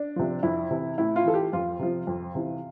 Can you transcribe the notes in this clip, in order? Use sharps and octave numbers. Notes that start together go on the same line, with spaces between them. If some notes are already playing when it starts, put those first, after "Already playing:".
Already playing: D4
C3 F3
F2 E4
C3 E3
A2 E4
F4
E3 A4
G4
F2 F4
C3 F3
F2
C3 E3